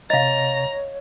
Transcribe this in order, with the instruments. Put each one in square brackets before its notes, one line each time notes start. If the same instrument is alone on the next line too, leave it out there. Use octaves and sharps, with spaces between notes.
[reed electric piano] C3 A6 [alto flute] C#5 [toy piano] D#5 F5 [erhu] A#5